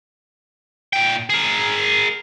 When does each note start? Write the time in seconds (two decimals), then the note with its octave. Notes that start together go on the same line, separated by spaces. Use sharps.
0.93 A#2 G5
1.30 G#4 A#4